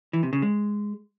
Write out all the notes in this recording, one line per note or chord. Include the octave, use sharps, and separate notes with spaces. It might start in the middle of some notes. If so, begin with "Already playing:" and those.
E3
C3
C#3
G#3